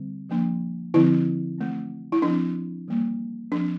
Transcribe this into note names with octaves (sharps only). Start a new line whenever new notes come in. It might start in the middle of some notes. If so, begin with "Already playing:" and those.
Already playing: D3 G3 C4
F3 A#3 D4
D3 F3 C4 E4
E3 A3 C4
E4
F3 C4 D4
E3 G3 A#3
F3 C4 D4